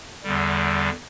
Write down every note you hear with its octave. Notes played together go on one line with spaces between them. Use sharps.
E2 D3 G3